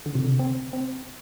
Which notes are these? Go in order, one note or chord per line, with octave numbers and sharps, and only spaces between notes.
D3
C3
D3
C4
C4